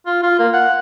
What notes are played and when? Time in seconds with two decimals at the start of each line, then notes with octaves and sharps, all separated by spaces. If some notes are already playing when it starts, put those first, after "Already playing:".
0.06 F4
0.23 F4
0.39 A#3
0.53 F#5